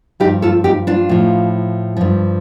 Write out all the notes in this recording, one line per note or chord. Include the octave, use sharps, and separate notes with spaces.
G2 F3 D#4 G4
F4 A4
D#4 G4
D4 F4
A2 F3
G2 F3